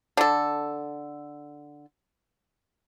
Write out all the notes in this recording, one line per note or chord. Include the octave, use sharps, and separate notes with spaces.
D3 A4